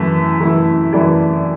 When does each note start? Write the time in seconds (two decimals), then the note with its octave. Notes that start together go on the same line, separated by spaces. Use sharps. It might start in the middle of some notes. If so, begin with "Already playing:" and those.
Already playing: F#2 E3 A3 E4 E5
0.39 F#2 E3 A3 E4
0.93 F#2 E3 A3 E4 D5